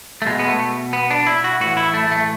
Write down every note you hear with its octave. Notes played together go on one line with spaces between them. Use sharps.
A3
B2 G#3
B3
A3
B3
D4
E4
F#4
A2 E3 F#4
E4
A3
A3